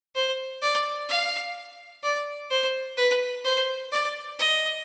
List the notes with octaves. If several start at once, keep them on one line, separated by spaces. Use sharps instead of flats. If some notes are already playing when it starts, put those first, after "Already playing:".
C5
D5
F5
D5
C5
B4
C5
D5
D#5